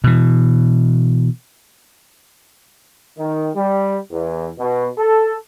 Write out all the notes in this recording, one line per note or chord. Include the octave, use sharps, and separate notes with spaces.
B2 E3
D#3
G3
E2
B2
A4